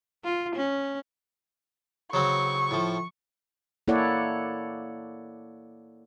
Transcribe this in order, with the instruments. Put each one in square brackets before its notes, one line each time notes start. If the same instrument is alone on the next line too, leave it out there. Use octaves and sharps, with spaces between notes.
[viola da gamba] F4
C#4
[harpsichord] C#3 F#3 C4 [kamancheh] C#6
[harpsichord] A2 F3
[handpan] A#3 E4 A4 C#5 D5 F#5